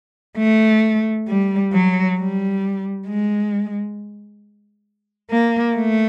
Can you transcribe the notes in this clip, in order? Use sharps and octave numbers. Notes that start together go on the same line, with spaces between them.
A3
G3
F#3
G3
G#3
A#3
A3